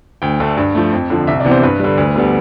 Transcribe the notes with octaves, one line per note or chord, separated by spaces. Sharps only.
D2 G5
D3 A3
G2
F3 A3
F2
D3 F3
C2 E5
D5
C3 E3 B3
C5
G2 B4
D3 G3
D2
D3 G3 B3